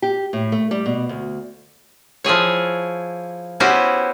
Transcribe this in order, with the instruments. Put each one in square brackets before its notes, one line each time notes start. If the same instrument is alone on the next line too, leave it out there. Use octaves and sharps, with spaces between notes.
[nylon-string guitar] G4
A2
A3
G3
B2
D2
[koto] F3 E4 G#4 C#5
B3 C#4 E4 F#4 G4 C5